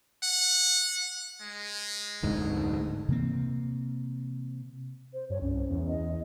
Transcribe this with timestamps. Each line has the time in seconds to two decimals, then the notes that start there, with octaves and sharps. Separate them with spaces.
0.23 F#5
1.41 G#3
2.23 F1 D2 G#2
3.08 C3 E3 A#3 C4
5.13 C5
5.30 G2 C#5
5.42 C2 C#4
5.70 E2
5.88 D#5